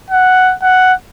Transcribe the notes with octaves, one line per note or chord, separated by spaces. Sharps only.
F#5
F#5